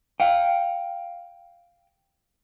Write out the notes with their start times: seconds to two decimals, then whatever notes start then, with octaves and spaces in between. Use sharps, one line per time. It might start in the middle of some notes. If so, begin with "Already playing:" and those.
0.20 F5 G5